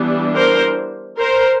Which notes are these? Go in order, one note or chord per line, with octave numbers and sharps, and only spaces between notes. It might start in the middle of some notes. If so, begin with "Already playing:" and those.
Already playing: E3 G3 B3 D4
A#4 C5
A#4 C5